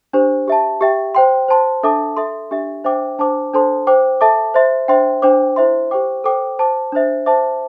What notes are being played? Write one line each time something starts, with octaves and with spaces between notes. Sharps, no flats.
D4 G4 C5
G4 E5 A5
G4 E5 G5
C5 G5 C6
C5 A5 C6
D4 A4 E5 A5 D6
A4 E5 C6
D4 G4 E5
D4 C5 E5 G5 D6
D4 C5 A5 D6
D4 A4 C5 A5 C6
C5 G5 D6
A4 E5 A5 D6
C5 E5 C6
D4 C5 E5 G5 C6
D4 C5 G5 D6
E4 C5 E5 C6
G4 C5 G5 D6
A4 C5 G5 D6
C5 A5 D6
D4 C5 E5
C5 E5 A5 D6